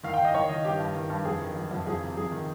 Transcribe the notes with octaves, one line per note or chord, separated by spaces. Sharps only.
D#3 F5
G5
D#3
D#5
D#3 C#5
D#3 D#5
G2 G4
G2
D#3
G2
F2 G#4
D#3
F2
F2
F2 G#4
C3
F2 G#4
D#3